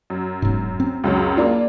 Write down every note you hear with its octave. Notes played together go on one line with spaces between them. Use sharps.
F#2
E1 G#2
C4
C#2 F#2 C#4
A#3 D4 F4